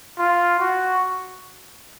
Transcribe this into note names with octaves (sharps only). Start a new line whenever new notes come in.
F4
F#4